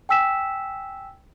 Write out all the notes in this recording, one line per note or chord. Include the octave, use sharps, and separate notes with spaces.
G5 G#5 E6 B6 E7